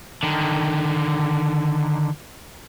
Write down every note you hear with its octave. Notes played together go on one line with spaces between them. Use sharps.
D3 D#3